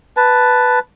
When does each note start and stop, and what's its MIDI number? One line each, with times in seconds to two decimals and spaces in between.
0.17 0.79 71
0.17 0.79 81